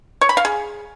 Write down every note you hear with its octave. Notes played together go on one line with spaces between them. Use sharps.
C#5
B5
F5
G#4